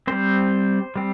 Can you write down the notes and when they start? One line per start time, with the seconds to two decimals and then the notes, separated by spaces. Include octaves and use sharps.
0.07 G3 C4 C5
0.96 G3 C4